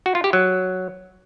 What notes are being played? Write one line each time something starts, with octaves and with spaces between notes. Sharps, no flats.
F#4
F4
G4
F#3